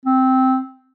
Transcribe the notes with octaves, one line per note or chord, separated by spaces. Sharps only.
C4